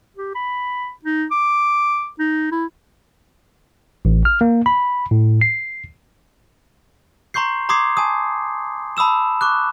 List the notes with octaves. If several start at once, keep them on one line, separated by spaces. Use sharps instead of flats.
G4
B5
D#4
D6
D#4
E4
A1
F6
A#3
B5
A2
C7
A#5 C6 C#6 G6 C7
A#5 C6 D6 D#6 G#6 C7
G#5 A5 D#6
A5 B5 D#6 E6 E7
C#6 D6 F#6